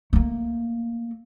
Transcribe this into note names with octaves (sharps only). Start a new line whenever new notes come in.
A3 A#3